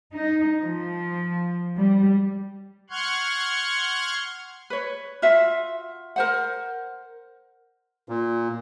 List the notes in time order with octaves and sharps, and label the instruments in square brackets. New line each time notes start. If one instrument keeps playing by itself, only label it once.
[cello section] D#4
F3
G3
[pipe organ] F#5 C6 C#6 F6 F#6 G#6
[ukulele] B4 C#5
F4 F#4 E5
A#4 C5 F#5
[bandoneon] A#2